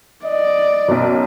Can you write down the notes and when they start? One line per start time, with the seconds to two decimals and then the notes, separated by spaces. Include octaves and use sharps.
0.25 D5 D#5
0.88 B1 F#2